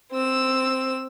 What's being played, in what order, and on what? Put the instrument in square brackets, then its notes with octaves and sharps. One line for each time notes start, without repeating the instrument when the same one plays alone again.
[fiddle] C4 E6